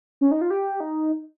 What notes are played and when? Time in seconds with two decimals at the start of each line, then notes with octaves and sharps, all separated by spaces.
0.21 C#4
0.31 D#4
0.41 F4
0.50 G4
0.80 D#4